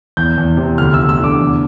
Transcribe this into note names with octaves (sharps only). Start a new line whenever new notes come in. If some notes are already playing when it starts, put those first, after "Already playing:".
E2 G6
E2
C3
D2 F6
D2 E6
E6
D3 D6
E2